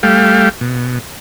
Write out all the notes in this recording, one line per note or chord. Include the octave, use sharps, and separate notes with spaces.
G3 A3 F5 G5
B2